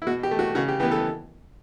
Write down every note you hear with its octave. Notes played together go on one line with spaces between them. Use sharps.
E4
B2 F#4
G4
A3
F#4
C#3 F#4
G4
E3 B3 G4
A4